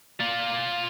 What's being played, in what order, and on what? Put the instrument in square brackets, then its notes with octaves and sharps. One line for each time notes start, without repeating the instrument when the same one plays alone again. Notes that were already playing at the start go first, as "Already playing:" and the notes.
[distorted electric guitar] F4 D5